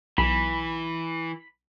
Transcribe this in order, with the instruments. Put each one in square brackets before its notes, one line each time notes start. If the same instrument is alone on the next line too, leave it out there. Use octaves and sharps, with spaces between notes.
[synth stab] B1 [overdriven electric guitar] E3 [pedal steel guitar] B5